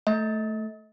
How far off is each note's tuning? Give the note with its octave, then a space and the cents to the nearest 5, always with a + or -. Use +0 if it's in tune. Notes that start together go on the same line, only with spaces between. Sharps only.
A3 +0 D#5 +40